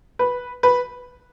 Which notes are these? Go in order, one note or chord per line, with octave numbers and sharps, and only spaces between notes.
B4
B4